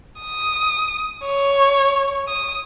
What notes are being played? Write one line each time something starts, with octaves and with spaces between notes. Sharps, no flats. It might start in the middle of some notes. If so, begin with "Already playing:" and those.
D#6
C#5
D#6